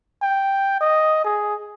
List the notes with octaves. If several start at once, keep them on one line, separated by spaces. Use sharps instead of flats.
G5
D#5
G#4